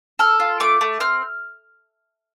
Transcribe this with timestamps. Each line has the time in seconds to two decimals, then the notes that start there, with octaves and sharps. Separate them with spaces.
0.19 A4 F6
0.40 F4
0.60 A3 D6
0.81 A3
1.00 C4 F6